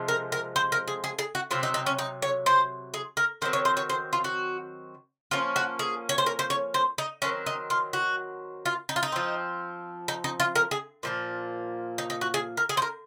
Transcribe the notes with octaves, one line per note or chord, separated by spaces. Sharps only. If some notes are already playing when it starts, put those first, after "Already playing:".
Already playing: C3 F3 G#3
A#4
A#4
C5
A#4
G#4
G#4
G#4
F#4
C3 F#3 C4 F4
D#4
D#4
C#4
D#4
C#5
C5
G#4
A#4
D#3 F#3 C4 C5
C#5
C5
C#5
C5
F4
F#4
F3 A#3 C#4 F4
F#4
G#4
C#5
C5
A#4
C5
C#5
C5
D#4
D#3 F#3 C4 C#4
D#4
F4
F#4
F4
D#4
F4
D#4
F3 C4
D#4
D#4
F4
A#4
G#4
A#2 F3 A#3
D#4
D#4
F#4
G#4
A#4
G#4
C5
A#4